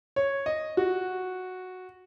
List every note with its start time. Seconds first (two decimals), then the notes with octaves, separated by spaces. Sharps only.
0.16 C#5
0.46 D#5
0.77 F#4